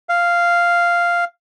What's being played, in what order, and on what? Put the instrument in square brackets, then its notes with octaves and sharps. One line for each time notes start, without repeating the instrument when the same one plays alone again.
[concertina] F5